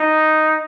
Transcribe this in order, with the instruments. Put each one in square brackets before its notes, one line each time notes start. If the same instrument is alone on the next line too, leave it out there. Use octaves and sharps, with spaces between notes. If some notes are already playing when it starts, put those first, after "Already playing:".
Already playing: [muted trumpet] D#4